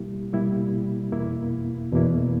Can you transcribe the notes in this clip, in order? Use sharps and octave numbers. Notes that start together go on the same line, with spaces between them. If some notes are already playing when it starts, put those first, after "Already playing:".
Already playing: B2 G3 A#3 E4 G4
B2 G3 A#3 E4 G4
E2 B2 A#3 E4
E2 B2 A#3 E4